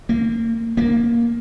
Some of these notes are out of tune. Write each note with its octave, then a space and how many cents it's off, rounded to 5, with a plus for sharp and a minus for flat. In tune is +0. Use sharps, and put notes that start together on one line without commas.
A#3 -25
A#3 +5